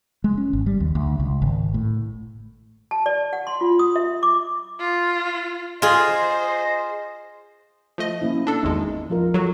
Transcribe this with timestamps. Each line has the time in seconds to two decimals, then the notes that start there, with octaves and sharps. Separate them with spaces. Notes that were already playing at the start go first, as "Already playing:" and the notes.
0.24 G#3
0.38 C#4
0.53 G#1
0.66 G3
0.80 D#2
0.95 D2
1.20 C#2
1.42 G#1
1.74 A2
2.91 A5
3.06 D5
3.33 F#5
3.47 C6
3.61 F4
3.79 D#6
3.96 E5
4.23 D6
4.79 F4
5.82 F4 G#4 C5 D#5
7.98 F3 A3 D#5
8.22 A#3 C#4 E4
8.47 D4 A4
8.63 G#1 E2 G#3 D#4
9.10 F3 F4 A#4
9.34 F#3 F#4 A4